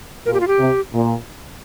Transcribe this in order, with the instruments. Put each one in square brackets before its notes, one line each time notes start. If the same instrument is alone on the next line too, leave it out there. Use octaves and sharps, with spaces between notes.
[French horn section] A#2 [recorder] A#4
[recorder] G4
F4
G4
[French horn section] C3
A#2